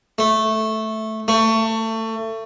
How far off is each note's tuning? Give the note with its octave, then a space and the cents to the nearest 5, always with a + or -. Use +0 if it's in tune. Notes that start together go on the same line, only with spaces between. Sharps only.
A3 -5
A3 +25